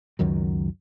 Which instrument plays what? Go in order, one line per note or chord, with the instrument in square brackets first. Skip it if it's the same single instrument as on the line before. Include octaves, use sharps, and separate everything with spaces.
[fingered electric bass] C#2 F#2 D#3 F#3